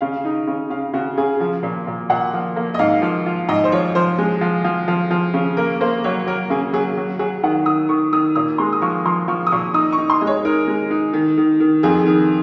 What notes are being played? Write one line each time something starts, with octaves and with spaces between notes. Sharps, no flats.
C#3 F5
D#4
C#3
C#3 F5
C#3 F#4
C#3 G#4
F3
A#2
A#2
A#2 F#5
F3
A#3
D#5
G#2 F5
F3
F4
G#2 D#5
C5
F3 C#5
F3 C5
G#3
F3
F3
F3
F3
C#3
A#3 A#4
A#3 C5
F#3 C#5
F#3 A#4
C#3 G#4
F#3 G#4
F#3
F#3 G#4
D#3 F#5
D#3 D#6
D#3 C#6
D#3 D#6
A#2 D#6
G#3 C6
D#6
F3 C#6
F3 C6
F3 C#6
D#6
A#2 C#6
D#4 D#6
C#6
D#4
C6
G#3 D#5
C#5
D#4 A#4
G#3
D#4
D#3
D#3
D#3
F2 G#4
D#3